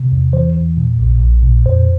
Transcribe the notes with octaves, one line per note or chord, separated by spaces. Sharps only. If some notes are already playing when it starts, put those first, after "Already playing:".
Already playing: C3
E2
E3 C5
E2
A#2
A#1
A#1
A#2
F2 C5